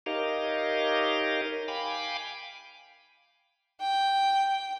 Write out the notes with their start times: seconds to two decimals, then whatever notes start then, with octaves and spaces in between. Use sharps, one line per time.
0.06 D#4 G4 A#4 C#5 D#5 F5
1.68 F5 G5 G#5 B5 D6
3.81 G5